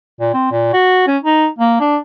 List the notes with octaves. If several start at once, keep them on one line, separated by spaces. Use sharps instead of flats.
A#2
C4
A#2
F#4
C#4
D#4
A#3
D4